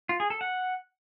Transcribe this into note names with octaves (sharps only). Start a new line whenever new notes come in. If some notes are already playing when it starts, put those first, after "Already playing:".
F4
G#4
A4
F#5